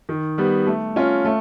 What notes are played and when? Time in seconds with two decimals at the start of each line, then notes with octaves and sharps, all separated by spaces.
0.09 D#3
0.38 G3 B3
0.67 A3
0.96 C#4 F4
1.25 A3